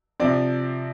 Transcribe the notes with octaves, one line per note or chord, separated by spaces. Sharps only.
C3 F3 C4 D5